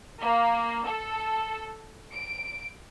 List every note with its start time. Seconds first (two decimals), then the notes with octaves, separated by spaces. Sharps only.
0.22 A#3
0.86 A4
2.13 D7